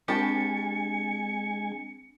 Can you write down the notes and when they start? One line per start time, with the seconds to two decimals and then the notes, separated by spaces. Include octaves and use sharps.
0.08 G#3 C4 D4 G4 G#5 A5 A6 C#7